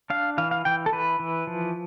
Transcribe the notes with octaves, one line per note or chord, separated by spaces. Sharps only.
D4 F5
E3 F5
F5
E3 G5
A4
E3 B4
E3
F3